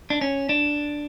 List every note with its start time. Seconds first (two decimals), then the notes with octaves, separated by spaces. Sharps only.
0.10 D4
0.21 C#4
0.49 D4